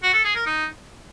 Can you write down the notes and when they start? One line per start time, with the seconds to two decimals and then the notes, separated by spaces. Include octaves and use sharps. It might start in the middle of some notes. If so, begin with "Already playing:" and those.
0.03 F#4
0.14 A4
0.25 G#4
0.35 A#4
0.46 D#4